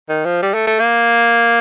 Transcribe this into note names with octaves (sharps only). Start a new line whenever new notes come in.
D#3
F3
G3
A3
A3
A#3